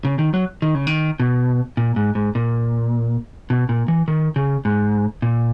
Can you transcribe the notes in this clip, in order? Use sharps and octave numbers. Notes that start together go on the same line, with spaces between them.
C#3
D#3
F#3
D#3
C#3
D#3
B2
A#2
G#2
G#2
A#2
B2
A#2
E3
D#3
C#3
G#2
A#2